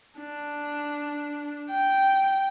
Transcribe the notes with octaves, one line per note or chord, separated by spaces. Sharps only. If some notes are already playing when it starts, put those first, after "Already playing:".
D4
G5